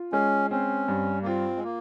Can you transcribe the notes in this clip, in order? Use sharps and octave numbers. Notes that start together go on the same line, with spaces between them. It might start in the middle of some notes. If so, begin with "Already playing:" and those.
Already playing: F4
G#3 C#4
C4 C#4
G2
A#3
C4 F4
G#3
A#3